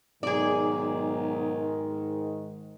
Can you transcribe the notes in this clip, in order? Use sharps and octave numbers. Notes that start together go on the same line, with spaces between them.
B1 G#2 D#3 G#4 D5